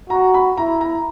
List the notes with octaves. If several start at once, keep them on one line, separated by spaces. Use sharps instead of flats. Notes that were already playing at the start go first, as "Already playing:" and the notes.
F#4 A#5
B5
E4 A#5
A#5